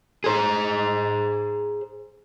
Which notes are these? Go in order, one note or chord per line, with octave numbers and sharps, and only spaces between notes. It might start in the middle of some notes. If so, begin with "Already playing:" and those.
G#4 C5